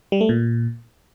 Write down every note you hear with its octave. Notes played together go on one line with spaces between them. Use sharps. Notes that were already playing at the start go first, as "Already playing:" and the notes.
G3
A3
A#2